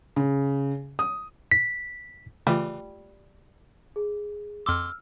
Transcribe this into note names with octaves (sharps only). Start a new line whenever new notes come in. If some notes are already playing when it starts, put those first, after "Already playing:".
C#3
D#6
B6
C#3 E3 G3 A3 F4
G#4
F2 C6 D6 E6 F6